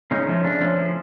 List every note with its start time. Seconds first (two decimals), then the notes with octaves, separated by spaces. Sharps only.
0.11 C#3 C#4 D#4
0.28 F3 A3 C#4
0.43 C#3 D4
0.60 F3 A3 C#4
0.77 F3